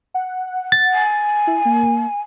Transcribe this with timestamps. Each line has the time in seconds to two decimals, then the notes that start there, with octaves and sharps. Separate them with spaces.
0.14 F#5
0.72 A6
0.93 G#5
1.47 E4
1.65 A#3